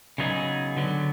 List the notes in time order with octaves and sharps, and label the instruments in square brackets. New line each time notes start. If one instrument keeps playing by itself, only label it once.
[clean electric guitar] C#3 F#3 B3 D#4 G#4
D3 F#3 B3